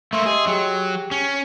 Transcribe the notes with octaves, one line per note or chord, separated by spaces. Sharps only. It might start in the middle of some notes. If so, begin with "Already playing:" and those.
A3 A#3 E5 C6 E6
G4 G#4 D#5 C6
F#3 G4 G#4 G5
C#4